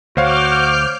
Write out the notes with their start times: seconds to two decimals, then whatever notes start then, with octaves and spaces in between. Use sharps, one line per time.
0.17 D2 F#4 C5 C#5 F5 D6 F6 G6